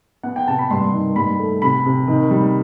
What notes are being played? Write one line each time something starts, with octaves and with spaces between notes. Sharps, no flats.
B3 F#5
G5
C3 A5
B5
G2 C6
D#3
G2 B5
A3
C3 B5
C3
D#3
G3